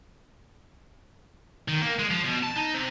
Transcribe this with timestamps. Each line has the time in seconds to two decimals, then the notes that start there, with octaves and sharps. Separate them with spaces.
1.68 D#3
1.81 A#3
1.99 G#3
2.10 F3
2.24 B2
2.43 A5
2.56 D#4
2.74 C3